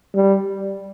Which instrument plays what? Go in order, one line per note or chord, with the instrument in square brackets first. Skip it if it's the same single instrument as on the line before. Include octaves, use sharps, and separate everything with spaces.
[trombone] G3